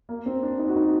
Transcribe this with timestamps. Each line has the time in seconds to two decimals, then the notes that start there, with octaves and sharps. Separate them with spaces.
0.09 A#3
0.26 C4
0.43 D4
0.59 D#4
0.68 F#4
0.76 D#4